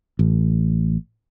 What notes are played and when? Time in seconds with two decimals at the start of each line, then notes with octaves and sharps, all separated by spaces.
0.19 A1